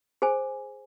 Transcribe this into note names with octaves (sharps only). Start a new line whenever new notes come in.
G#4 C5 G#5